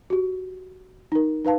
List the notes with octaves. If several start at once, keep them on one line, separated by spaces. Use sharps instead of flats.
F#4 G4
D#4 A#4
D#4 B4 F5 A5